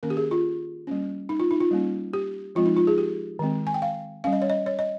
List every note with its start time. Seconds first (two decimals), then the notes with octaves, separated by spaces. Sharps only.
0.03 D#3 A#3 C#4 A#4
0.10 G4
0.17 G#4
0.31 F4
0.87 G3 A#3 C#4
1.29 D#4
1.40 F4
1.51 D#4
1.61 F4
1.71 G3 A#3 C#4
2.13 G4
2.55 F3 G#3 C4 F4
2.66 D#4
2.77 F4
2.87 G#4
2.98 G4
3.39 D#3 G#3 C4
3.67 G#5
3.74 G5
3.82 F5
4.24 G3 C#4 F5
4.33 D#5
4.42 C#5
4.50 D#5
4.66 C#5
4.79 D#5